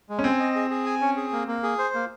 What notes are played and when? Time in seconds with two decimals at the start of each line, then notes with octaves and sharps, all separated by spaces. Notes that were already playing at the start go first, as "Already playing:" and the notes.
0.09 G#3
0.19 C#4
0.24 C4 G#5
0.39 D#5
0.55 G#4
0.70 G#4
0.86 G#5
1.01 C#4
1.17 G#4
1.32 A#3
1.48 A#3
1.63 G#4
1.78 C5
1.94 A#3